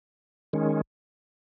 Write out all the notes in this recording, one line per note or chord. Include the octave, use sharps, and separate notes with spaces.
D#3 G#3 C#4